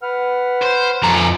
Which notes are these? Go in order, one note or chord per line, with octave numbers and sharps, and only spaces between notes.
B4 F#5 F6
C5
F2 E3 A4 A#5